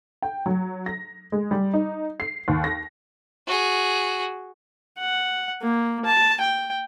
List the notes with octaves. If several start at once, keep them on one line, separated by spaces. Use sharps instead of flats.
G5
F#3
A#6
G#3
G3
D#4
C7
D#2
A#6
F#4 G#4
F#5
A#3
A5
G5